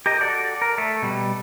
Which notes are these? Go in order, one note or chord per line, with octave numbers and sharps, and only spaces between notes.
G4 A#4 D#5
F#4 A4 D5
A#4
A3
B2 G3